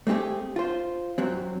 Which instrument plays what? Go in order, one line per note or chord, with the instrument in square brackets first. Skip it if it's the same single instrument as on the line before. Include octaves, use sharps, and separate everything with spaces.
[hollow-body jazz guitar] A3 C4 D#4 G4 G#4
F4 C5
F#2 F#3 C4